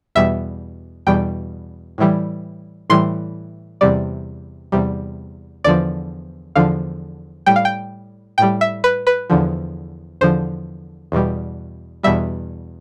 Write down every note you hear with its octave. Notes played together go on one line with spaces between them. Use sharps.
E2 B2 G3 E5
E2 B2 G3 G5
A2 E3 G3
A2 E3 G3 C6
E2 C3 G3 D5
E2 C3 G3
E2 D3 F3 D5
E2 D3 F3 F5
A2 G3 G5
F5
G5
A2 G3 G5
E5
B4
B4
E2 D3 F3
E2 D3 F3 C5
E2 B2 G3
E2 B2 G3 E5